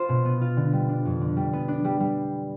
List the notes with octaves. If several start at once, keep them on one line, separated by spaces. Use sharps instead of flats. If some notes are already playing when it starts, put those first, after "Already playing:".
Already playing: F4 C5
B2
B3
F4
D3
G3
D4
F2
D3
G3
B3
D4
G3
G3